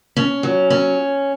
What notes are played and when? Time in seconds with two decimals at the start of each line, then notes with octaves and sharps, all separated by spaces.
0.16 C#4
0.43 F#3
0.70 C#4